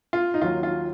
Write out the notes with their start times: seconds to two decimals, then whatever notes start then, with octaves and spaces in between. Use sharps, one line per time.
0.13 F4
0.34 D#4
0.41 D#2 D#3 F#3 F4
0.63 F4